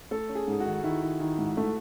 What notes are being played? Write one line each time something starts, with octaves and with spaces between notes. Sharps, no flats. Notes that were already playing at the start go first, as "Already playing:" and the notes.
A3 A4
C#4
G#4
G#2 G#4
F#4
D#3
D#3 E4
D#3
D#3
G#2
A3